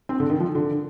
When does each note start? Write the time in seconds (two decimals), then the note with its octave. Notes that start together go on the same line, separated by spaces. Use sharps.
0.09 C4
0.20 D3
0.30 D#3
0.40 F3
0.55 D3